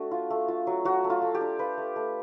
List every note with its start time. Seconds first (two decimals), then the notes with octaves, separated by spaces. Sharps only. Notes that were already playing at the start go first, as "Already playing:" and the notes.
Already playing: A3 D4 F#4
0.11 F4
0.30 A3
0.48 F4
0.67 F#3
0.85 F#3 F#4
1.04 A3
1.10 F4
1.22 A3
1.34 G4
1.41 D4
1.59 F4 B4
1.78 A3
1.96 A3